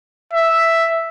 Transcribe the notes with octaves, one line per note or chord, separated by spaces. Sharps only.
E5